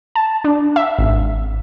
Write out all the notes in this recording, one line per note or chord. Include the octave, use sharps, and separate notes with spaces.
A5
D4
E5
G#1